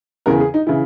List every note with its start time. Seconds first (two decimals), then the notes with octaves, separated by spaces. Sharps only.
0.26 E2 C#3 E3 A#4
0.40 G#4
0.54 D#4
0.67 C#3 E3 E4